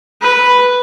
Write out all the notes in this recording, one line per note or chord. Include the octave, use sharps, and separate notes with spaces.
B4